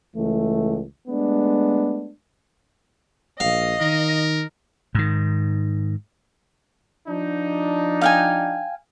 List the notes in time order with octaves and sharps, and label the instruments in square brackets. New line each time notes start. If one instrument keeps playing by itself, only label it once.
[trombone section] C#2 E3 A3
G#3 A3 B3 D4
[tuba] A#1 [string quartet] D#5 [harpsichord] F5
[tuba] D#3 [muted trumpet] A#4
[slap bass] G#2 D#3
[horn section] F3 D4 D#4
[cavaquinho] F5 G5 G#5